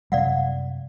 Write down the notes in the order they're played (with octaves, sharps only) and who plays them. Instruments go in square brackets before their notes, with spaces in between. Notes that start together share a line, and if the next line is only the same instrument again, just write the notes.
[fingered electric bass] F#2 C3 G3 [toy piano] D5 F5 F#5